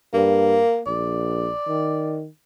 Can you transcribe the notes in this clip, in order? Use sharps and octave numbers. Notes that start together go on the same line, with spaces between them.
G2 A#3
A#1 D5
D#3